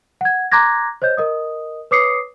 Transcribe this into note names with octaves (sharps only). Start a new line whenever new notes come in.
F#5 G#6
A#5 C6 D6 F#6 G#6 A#6
C5 C#5 D#5 G6
A#4 D#5 D#6
B4 C#5 D6 D#6 C7 C#7